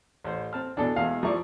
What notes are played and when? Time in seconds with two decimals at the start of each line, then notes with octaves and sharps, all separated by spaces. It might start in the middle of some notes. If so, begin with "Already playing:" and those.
0.24 A1 C5
0.53 C4 A5 F6
0.77 B2 E3 D4 A4
0.96 E2 B2 G#3 F5
1.23 F3 E4 D5 A#5 C#6